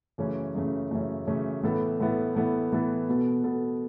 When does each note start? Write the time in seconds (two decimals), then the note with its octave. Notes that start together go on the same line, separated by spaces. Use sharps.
0.18 F#2 C#3 E3 A3 C#4
0.55 F#2 C#3 E3 A3 C#4
0.91 F#2 C#3 E3 A3 C#4
1.27 F#2 C#3 E3 A3 C#4
1.63 A2 E3 B3 E4 A4
2.00 A2 E3 B3 E4 A4
2.35 A2 E3 B3 E4 A4
2.71 A2 E3 B3 E4 A4
3.09 B2 B3 A4
3.44 B2 B3 A4